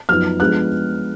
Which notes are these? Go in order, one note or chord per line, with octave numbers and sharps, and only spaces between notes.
F#2 F3 B3 D#4 F6
F3 G#3 B3 D4 F#6